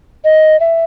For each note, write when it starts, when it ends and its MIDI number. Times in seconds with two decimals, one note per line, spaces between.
0.24 0.59 75
0.60 0.84 76